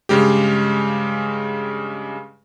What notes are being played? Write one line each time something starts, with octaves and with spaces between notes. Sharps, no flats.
G2 C#3 G#3 G4